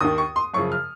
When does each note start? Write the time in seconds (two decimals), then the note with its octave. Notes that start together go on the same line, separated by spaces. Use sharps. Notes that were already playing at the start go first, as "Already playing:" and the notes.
0.01 D#2 D#3 D#6
0.18 C#6
0.36 C6
0.54 F#2 C#3 F3 C#6
0.72 F6